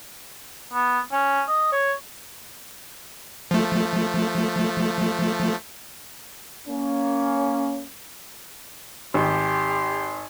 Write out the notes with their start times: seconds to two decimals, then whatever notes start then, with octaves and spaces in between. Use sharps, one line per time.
0.73 B3
1.12 C#4
1.48 D#5
1.72 C#5
3.51 F3 A3
6.67 A#3 C#4
9.14 G#1 G4 C6